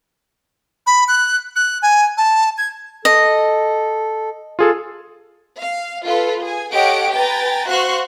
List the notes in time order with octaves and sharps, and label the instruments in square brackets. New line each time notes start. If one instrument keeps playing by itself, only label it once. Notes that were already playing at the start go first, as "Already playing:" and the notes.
[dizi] B5
F#6
F#6
G#5
A5
G#6
[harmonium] A4 [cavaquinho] D#5
[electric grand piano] F4 G#4 A4
[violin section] F5
F4 A4 B4
G#4 G#5
G4 A4 C#5 D#5 F#5 D7
B4 G5 G#5 A#5 A6
F#4 C5 F5 C6 C#6 F#6